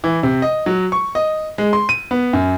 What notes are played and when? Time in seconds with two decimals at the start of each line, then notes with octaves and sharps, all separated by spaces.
0.04 E3
0.23 C3
0.42 D#5
0.66 F#3
0.92 C#6
1.15 D#5
1.58 G#3
1.73 C6
1.89 D#7
2.11 B3
2.33 F#2